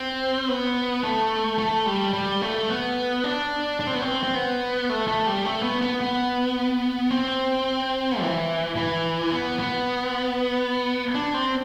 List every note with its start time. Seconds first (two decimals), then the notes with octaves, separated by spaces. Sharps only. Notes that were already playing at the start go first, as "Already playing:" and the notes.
Already playing: C4
0.48 B3
1.03 A3
1.59 A3
1.86 G3
2.13 G3
2.41 A3
2.69 B3
3.24 D4
3.80 D4
3.87 C4
3.94 B3
4.02 C4
4.24 C4
4.35 B3
4.89 A3
5.08 A3
5.27 G3
5.45 A3
5.63 B3
5.81 B3
6.01 B3
7.11 C4
8.21 E3
8.76 E3
9.31 B3
9.59 B3
11.15 D4
11.34 C4